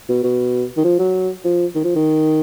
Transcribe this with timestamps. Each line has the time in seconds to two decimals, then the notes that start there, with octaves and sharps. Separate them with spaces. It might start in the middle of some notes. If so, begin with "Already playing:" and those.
0.09 B2
0.23 B2
0.77 D#3
0.84 F3
0.99 F#3
1.45 F3
1.75 D#3
1.84 F3
1.95 D#3